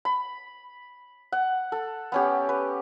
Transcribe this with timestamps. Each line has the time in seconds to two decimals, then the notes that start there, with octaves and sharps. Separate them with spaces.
0.05 B5
1.32 F#5
1.72 A4
2.12 B3 C#4 G4
2.49 B4